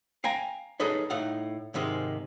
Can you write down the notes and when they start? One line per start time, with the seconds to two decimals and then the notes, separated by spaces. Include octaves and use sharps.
0.24 F5 G5 G#5 A#5
0.80 D#4 G#4 A4 B4 C#5
1.10 A2 D#4 F5 F#5
1.74 G#2 C3 D#3 G#3